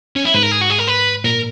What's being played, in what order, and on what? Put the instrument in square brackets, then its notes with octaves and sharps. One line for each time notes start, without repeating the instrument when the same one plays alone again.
[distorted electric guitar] C#4
E4
[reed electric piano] G#2 [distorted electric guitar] B4
[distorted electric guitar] A#4
G#4
F#4
G#4
A#4
B4
[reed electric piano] A#2 [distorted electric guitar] A#4